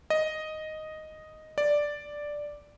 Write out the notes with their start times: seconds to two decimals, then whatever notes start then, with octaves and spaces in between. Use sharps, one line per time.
0.10 D#5
1.58 D5